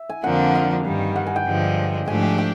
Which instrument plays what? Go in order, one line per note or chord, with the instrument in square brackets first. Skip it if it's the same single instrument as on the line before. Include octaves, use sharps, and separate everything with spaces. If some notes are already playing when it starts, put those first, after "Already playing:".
Already playing: [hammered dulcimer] E5
G#5
[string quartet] F2 D3 F3 A#3 D4 [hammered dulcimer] F#5
[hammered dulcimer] F5
[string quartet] G2 D#3 G3
[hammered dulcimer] F#5
G#5
G5
[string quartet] G2 D3 F3 G#3
[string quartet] G#2 F3 A3 D4 G4 [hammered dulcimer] G#5
[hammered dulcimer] G5
G5